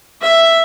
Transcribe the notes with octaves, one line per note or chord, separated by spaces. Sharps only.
E5